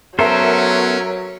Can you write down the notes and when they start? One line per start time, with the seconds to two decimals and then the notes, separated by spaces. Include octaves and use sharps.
0.19 F#3 B3 C#4 A4 A#4 C5 E5